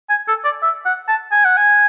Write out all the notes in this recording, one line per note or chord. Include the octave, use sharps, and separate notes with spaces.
G#5
A4
D5
E5
F#5
A5
G#5
F#5
G#5